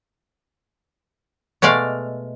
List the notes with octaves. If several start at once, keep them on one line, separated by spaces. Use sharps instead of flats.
B2 G#3 A3 D5 F5